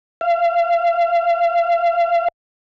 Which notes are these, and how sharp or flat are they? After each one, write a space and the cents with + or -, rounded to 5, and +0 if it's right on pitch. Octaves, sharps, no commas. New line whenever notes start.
F5 -35